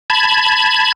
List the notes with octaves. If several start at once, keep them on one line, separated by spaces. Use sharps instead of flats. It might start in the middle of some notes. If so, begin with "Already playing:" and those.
A5 B5 G#6